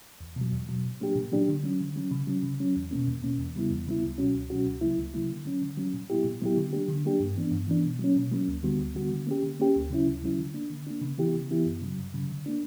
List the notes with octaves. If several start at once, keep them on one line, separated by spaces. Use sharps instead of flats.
E2
B2 F#3
E2
B2 F#3
A#2
F#3 A#3 D4 G4
A#2
F#3 A#3 D4 G4
D3
F#3 C#4
D3
F#3 C#4
C#3
F#3 C#4
C#3
F#3 C#4
E2
B2 A#3 C#4
E2
B2 A#3 C#4
E2
C#3 G3 B3 E4
E2
C#3 G3 B3 E4
C#2
B2 F#3 C#4 F#4
C#2
B2 F#3 C#4 F#4
C#2
C#3 F#3 A#3 E4
C#2
C#3 F#3 A#3 E4
D3
F#3 C#4
D3
F#3 C#4
A#2
F#3 B3 E4 G4
A#2
F#3 B3 E4 G4
D3
F#3 A#3 D4 G4
D3
F#3 A#3 D4 G4
G2
E3 B3 D4
G2
E3 B3 D4
B2
F#3 A#3 C#4
B2
F#3 A#3 C#4
D2
D3 G3 B3 F#4
D2
D3 G3 B3 F#4
D3
A#3 C#4 G4
D3
A#3 C#4 G4
D2
C#3 F#3 C#4 E4
D2
C#3 F#3 C#4 E4
D3
A#3 D4
D3
A#3 D4
C#3
E3 B3 E4 G4
C#3
E3 B3 E4 G4
F#2
C#3 F#3
F#2
C#3 F#3
D3
A#3 D4